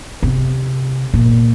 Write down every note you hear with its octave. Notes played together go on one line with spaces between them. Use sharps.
C3
A#2